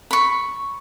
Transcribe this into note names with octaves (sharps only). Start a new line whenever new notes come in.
B5 C#6